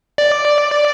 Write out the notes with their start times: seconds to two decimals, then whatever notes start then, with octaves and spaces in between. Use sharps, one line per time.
0.18 D5